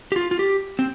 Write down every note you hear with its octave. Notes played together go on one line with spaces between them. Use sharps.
G4
F4
F4
G4
C4